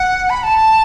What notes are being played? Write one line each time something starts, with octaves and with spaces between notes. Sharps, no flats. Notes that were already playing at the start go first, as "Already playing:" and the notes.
Already playing: F#5
B5
A5